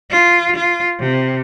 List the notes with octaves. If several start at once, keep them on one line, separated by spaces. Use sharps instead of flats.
F4
F4
C3